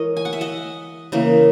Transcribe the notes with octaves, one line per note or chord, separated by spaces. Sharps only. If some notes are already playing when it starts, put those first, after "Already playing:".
Already playing: E3 G#3 A#4 C#5 D#5
G#5
F#5
E5
D#5 F#5
C#3 E3 A#3